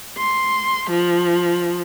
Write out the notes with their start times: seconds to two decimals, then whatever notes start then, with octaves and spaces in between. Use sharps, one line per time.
0.18 C6
0.89 F3